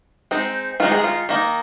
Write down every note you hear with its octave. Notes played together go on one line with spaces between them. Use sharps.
G#3 C4 D#4
D#3 G#3 D#4 F4
G#4
F4
D#3 A#3 D#4